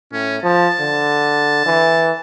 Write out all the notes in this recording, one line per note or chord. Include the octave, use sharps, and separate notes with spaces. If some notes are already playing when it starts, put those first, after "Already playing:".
A2 C#4
F3 A5
D3
E3